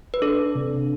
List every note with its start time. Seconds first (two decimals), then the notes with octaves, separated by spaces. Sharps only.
0.14 B4
0.22 D4 A4
0.55 C3